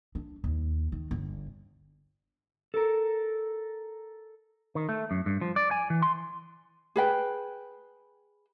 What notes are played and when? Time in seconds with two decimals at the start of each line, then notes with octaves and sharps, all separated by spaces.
0.15 D4
0.44 D#2
0.92 D#3
1.11 G1
2.74 A4 A#4
4.75 D#3
4.89 A3
5.11 F#2
5.26 G2
5.41 F3
5.56 D5
5.71 G#5
5.90 E3
6.02 C6
6.96 G#4 B4 G5